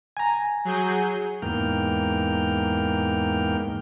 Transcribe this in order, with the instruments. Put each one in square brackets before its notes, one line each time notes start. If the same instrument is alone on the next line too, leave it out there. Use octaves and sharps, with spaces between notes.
[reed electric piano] G#5 A#5
[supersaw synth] F#3 G#4 G6
[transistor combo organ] E2 G#2 A#3 G5 F6